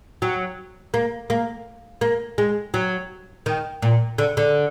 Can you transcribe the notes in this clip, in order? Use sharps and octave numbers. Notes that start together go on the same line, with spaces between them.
F#3
A#3
A#3
A#3
G#3
F#3
D#3
A#2
D3
D3